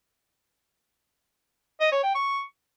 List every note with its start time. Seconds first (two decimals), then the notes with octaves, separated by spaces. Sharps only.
1.81 D#5
1.92 C#5
2.04 G5
2.15 C#6